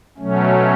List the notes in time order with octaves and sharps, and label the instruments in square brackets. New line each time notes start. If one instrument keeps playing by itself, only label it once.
[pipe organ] B2 F#3 A3 C#4